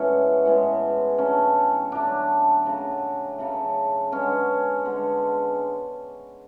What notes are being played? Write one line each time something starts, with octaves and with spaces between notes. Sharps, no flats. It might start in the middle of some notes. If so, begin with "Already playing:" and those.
Already playing: A2 E3 G#3 B3 C#4
A2 E3 G#3 B3
D3 F#3 A3 C#4
D3 F#3 A3 D4
C#3 F#3 A3
C#3 F#3 A3
D3 G#3 B3 C#4
D3 G#3 B3